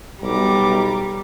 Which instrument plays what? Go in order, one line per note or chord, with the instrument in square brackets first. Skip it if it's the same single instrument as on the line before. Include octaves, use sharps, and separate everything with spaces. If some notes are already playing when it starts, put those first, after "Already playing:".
[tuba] B1 [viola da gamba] G3 [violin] A#5 D6